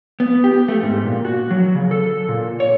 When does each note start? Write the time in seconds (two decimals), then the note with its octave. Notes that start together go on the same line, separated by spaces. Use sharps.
0.20 B3
0.44 G4
0.68 A3
0.83 G#2
1.06 A#2
1.25 F#4
1.51 F#3
1.75 C#3
1.91 A4
2.29 A#2
2.60 C#5